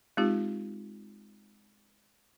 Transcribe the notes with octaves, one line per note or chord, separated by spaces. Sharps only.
G#3 C4 D#4 F4 G4